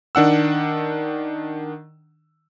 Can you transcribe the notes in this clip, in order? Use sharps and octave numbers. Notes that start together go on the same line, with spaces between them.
D#3 D4 F#5 E6